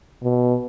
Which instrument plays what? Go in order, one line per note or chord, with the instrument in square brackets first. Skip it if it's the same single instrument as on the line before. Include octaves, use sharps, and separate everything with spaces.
[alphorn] B2